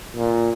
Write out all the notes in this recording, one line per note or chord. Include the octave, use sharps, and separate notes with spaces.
A#2